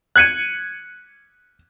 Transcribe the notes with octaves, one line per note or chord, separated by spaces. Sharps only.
F#6 G#6 C#7 D#7